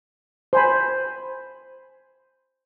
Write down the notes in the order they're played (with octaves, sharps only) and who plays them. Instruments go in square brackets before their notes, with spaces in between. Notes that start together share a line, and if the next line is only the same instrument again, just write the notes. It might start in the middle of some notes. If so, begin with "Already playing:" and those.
[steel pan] C5 G#5 B5